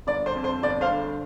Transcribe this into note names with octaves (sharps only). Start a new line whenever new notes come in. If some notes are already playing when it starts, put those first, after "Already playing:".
G1 D5
C5
F2
C5
G1 D5
C5 F5
D3